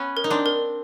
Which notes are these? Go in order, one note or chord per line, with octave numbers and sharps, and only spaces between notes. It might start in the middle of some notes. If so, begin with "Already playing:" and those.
Already playing: B3 C#4
A#4
D#4
C4 D4
A#4